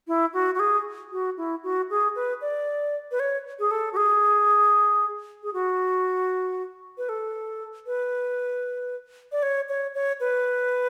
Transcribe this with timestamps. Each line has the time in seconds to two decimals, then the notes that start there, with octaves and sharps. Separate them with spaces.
0.08 E4
0.33 F#4
0.55 F#4
0.60 G#4
1.12 F#4
1.37 E4
1.63 F#4
1.90 G#4
2.15 B4
2.41 D5
3.11 B4
3.20 C#5
3.59 G#4
3.71 A4
3.93 F#4
3.97 G#4
5.43 G#4
5.53 F#4
6.98 B4
7.09 A4
7.86 B4
9.32 D5
9.43 C#5
9.69 C#5
9.94 C#5
10.20 B4